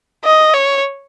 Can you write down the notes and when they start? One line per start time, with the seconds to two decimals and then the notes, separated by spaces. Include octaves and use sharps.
0.25 D#5
0.53 C#5